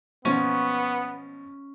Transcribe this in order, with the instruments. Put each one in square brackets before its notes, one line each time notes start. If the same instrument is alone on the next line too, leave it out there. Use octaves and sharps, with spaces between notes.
[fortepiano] B2 F3 [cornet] B3 [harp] C#4